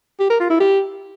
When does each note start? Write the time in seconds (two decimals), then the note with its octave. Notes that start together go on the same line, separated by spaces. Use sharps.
0.20 G4
0.30 A#4
0.40 F4
0.50 E4
0.60 G4